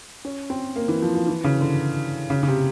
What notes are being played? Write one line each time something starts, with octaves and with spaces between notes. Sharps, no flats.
C#4
C4
A#3
E3
F3
F3
E3
C#3
D3
C#3
C#3
C3